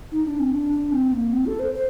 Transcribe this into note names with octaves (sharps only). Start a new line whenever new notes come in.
D#4
D4
C4
D4
D4
C4
A#3
C4
A4
C5
C5